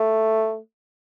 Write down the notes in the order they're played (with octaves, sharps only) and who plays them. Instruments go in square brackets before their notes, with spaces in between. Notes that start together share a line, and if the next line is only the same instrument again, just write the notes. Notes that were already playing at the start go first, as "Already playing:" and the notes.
Already playing: [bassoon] A3